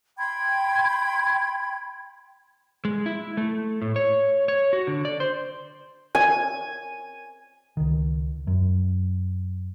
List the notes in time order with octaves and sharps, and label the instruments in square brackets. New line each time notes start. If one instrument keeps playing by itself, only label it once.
[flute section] G5 B5 C6 G#6
[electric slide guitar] G#3
E4
A3
A2
C#5
C#5
F#4
D3
D5
C5
[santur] G#5
[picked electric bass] C#2 D#3
F#2